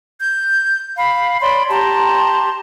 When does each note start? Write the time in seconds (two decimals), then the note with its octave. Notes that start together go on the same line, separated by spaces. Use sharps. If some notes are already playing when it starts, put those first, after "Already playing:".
0.19 G6
0.97 F5 B5
1.42 C#5 D5 B5 C6
1.70 G4 A5 A#5 C6